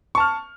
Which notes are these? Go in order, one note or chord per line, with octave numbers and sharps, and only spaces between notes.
A5 C#6 F6